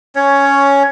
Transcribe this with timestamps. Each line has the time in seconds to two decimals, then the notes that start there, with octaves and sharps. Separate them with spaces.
0.16 C#4 C#5